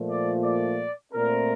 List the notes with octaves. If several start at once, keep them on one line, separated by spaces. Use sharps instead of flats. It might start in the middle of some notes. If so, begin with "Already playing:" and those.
Already playing: A#2 F3 A3
D5
D5
A#2 A3 C4 A#4